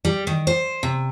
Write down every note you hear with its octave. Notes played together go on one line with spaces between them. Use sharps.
G3
D#3
C5
C3